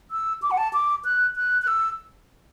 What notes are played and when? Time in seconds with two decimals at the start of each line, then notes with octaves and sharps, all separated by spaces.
0.11 E6
0.42 D6
0.51 F#5
0.58 A5
0.73 D6
1.05 F#6
1.36 F#6
1.62 F#6
1.67 E6